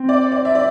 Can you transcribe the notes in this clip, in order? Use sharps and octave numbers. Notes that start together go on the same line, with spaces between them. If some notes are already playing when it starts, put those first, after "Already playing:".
Already playing: C4
D5
D5
E5
D5